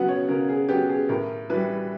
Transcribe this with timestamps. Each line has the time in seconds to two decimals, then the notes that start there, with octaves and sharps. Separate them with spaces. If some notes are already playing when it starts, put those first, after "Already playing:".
Already playing: C#3 F#3 B3 F#5
0.08 C#5
0.29 C#3 A#4
0.49 G#4
0.69 F#3 B3 G4
0.89 G#4
1.09 A2 A#4
1.50 E3 G3 B4